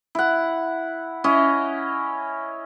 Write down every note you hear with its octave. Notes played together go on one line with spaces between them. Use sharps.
E4 F#5
C#4 E4 D#5